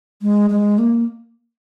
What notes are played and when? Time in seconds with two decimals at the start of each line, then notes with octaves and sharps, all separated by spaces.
0.22 G#3
0.50 G#3
0.78 A#3